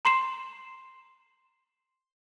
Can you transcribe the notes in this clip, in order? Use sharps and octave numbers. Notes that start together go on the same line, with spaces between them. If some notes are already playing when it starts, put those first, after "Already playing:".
A#5 C6 C7 E7